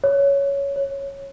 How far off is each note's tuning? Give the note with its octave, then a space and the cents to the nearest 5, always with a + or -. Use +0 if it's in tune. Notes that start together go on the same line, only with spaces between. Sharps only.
C#5 +10
C#5 -5